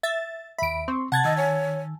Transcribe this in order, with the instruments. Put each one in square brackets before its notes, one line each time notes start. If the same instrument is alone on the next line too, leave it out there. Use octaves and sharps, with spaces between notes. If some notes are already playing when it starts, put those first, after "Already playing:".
[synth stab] E5 A6
[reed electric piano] D#2 E5 [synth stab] B5 D7
[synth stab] C4 [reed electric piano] C6 C#6
[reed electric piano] C3 [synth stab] F#5 G#6 A6 [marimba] A5
[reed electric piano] D#3 E6 [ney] D#5
[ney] C#5 [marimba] G#5